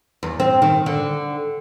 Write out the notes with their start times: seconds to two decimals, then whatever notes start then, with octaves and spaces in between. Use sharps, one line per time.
0.23 E2
0.40 C4
0.62 D#3
0.86 D3